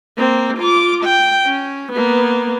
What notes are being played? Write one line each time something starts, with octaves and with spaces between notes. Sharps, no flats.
A#3 C4
F4 D6
G5
C#4
A#3 B3